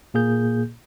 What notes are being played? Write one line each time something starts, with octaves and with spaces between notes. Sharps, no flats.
A#2 A#3 G#4 G6